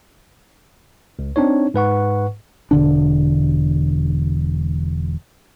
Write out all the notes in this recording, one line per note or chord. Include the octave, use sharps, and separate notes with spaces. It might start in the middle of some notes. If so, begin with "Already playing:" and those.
C#2
C4 D4 D#4 C#5
G#2 B4 F#5 C#6
E1 D3 D4